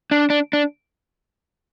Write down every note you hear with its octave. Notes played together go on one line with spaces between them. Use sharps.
D4
D4
D4